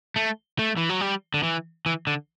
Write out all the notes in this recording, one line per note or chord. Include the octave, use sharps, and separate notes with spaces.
A3
A3
E3
F#3
G3
D3
E3
E3
D3